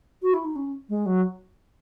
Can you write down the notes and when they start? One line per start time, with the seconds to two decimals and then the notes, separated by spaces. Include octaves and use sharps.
0.22 F#4
0.33 E4
0.44 D#4
0.55 C#4
0.89 G#3
1.06 F#3